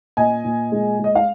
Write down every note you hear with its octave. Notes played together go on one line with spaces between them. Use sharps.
A#2 D#5 G#5
A#2
G#3
G#3 D#5
F5